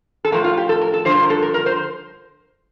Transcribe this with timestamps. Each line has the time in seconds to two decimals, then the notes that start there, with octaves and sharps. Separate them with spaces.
0.25 A4
0.32 A2 F3 A#4
0.44 F4
0.57 G4
0.69 A4
0.81 A#4
0.94 A4
1.05 G2 D3 F3 C5
1.23 A#4
1.30 A4
1.42 A#4
1.54 A#4
1.66 C5